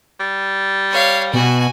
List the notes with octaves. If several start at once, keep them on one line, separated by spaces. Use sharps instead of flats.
G3
C#5 F5
B2 F#4 G#5